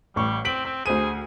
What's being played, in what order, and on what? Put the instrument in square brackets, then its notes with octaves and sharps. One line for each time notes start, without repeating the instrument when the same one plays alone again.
[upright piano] A1 C#6 [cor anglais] G3
[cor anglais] C4 [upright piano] B6 D7 F#7
[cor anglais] C4 [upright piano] B6
[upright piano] D2 C5 D#7 [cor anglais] G#4